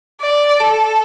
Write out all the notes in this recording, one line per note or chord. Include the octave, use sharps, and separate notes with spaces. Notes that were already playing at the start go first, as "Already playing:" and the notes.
D5
A4